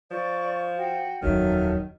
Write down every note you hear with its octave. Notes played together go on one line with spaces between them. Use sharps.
F3 D5 C#6
F#4 G5
D#1 F2 D#3 F#3 A4 E5 F6